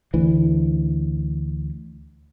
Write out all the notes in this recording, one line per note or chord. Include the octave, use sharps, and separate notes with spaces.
D2 E3